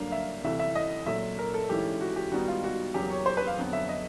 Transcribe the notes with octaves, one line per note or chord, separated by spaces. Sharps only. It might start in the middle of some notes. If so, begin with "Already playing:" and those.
Already playing: G2 D3 F#3 A#3 D4 F5
E5
C2 C3 E3 A3 E5
E5
D#5
A#2 F#3 A3 E5
A#4
A4
G#2 E3 A3 C#4 E4 G4
F#4
G4
G#2 D#3 G3 B3 D#4 F#4
F4
F#4
E2 C#3 F#3 A#3 G4
C#5
C5
B4
F5
F2 D3 F#3 B3
E5
D#5